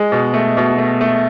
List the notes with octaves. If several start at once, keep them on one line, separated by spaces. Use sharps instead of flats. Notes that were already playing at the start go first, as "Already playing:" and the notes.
Already playing: G#3
B2
A3
B2
A3
A3